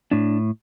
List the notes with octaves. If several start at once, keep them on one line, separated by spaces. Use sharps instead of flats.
A2 D4